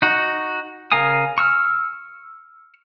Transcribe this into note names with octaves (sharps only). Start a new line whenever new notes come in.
D#4 F#4
C#3 A#4 F5 G#5 D#6
C#6 E6 F6